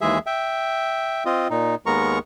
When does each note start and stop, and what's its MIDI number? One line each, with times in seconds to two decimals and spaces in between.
0.01 0.18 39
0.01 0.18 52
0.01 0.18 56
0.01 0.18 68
0.01 0.18 76
0.26 1.24 76
0.26 1.24 79
1.26 1.48 60
1.26 1.48 65
1.26 1.48 75
1.50 1.75 46
1.50 1.75 63
1.86 2.19 39
1.86 2.19 56
1.86 2.19 59
1.86 2.19 70
1.86 2.19 82
1.86 2.19 85